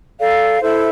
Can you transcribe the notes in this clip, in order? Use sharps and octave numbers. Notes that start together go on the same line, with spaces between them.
A4 D5 F5
E4 A4 C5 E5